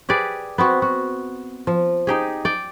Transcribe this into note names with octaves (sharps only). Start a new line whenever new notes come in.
G4 G#4 B4 D5
B3 C4 F#4
F#4
F3
D#4 G4 G#4
D5 G5